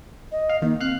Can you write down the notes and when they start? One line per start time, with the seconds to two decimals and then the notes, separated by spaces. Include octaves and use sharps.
0.31 D#5
0.49 F5
0.62 D#3 A#3
0.80 C4 F5 F#6